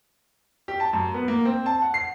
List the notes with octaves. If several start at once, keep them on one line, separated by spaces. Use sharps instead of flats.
G4
A5
F#2
B3
A#3
C4
A5
F#5
C7